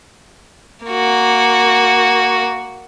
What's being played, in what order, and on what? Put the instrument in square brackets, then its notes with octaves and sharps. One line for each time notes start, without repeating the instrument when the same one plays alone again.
[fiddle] A#3 F#4